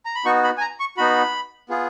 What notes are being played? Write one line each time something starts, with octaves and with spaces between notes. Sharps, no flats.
A#5
B5
B3 D#4 F#4 C#6
B5
G#5
A#5
C#6
B3 D#4 F#4 B5
B3 F4 G#4